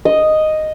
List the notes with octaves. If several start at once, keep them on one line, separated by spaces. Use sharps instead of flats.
D#5